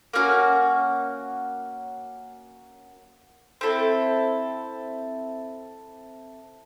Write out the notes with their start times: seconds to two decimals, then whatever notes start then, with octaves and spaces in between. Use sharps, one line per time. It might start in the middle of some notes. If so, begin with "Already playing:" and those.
0.13 A#3 C#4 F#4
3.61 C4 E4 A4